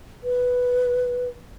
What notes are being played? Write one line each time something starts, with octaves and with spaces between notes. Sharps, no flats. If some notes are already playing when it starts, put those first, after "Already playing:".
B4